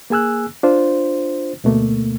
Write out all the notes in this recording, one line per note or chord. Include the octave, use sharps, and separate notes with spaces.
A#3 G#4 G#5 E6 F#6
D4 F4 C5
D2 B2 A3 A#3